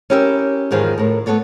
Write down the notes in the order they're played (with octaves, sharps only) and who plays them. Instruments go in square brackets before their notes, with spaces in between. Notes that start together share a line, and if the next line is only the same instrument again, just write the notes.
[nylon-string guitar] C#4 E4 G4 A#4 C5 E5
E2 G#2 D#3 F3 G#4
A2 A#4
A3 B3 A4 C#5 D5